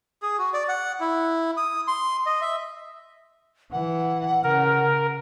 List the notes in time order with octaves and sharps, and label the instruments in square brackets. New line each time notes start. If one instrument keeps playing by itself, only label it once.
[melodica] G#4
F#4
D5
F#5
E4
D#6
C6
D#5
E5
[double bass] E3 [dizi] F#5
[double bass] C#3 [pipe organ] A#4